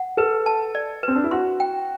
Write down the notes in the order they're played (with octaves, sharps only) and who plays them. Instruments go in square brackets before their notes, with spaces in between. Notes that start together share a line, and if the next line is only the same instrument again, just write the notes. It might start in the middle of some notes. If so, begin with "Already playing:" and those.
Already playing: [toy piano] F#5
[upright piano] A4 [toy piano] B4
[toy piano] A5
D5
[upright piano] C4 [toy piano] B4
[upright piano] D4
E4
[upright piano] F#4 [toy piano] C6
[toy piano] G5